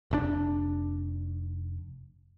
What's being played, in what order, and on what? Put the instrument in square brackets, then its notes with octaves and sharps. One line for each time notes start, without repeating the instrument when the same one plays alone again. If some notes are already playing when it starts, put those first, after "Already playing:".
[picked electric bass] F1 C3 D4